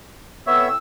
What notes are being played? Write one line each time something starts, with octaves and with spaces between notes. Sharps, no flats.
A2 B3 C4 C#5 E5 E6